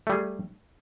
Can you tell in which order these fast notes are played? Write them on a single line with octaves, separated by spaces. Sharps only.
A3 G3 G#4